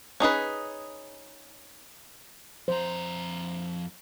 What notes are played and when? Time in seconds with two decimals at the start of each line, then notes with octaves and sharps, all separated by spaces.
0.20 C#4 D#4 G#4 B4
2.68 F2 C5 A#5